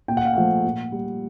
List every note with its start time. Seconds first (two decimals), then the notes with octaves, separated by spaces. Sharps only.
0.08 A#2 G5
0.17 F#5
0.25 F5
0.34 F3 A3 F#5
0.64 A#2
0.92 G3